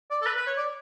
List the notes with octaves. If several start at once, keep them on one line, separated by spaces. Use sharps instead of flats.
D5
A4
B4
B4
C#5
D5